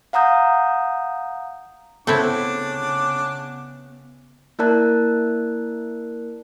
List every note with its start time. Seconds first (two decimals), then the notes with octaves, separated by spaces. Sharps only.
0.13 F5 F#5 A#5 D#6 G6
2.07 C#3 A3 B3 C4 D4 E4 D6
4.59 A#3 E4 A#4 D5 A5 F#6